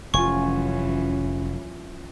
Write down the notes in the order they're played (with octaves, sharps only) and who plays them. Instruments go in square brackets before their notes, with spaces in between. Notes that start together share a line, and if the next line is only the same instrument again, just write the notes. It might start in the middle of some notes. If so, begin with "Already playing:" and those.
[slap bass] F1 [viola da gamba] F#2 E3 C#4 [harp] F4 G#5 [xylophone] C#6